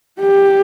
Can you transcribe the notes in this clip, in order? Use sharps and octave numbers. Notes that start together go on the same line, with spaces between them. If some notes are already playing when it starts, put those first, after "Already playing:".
G4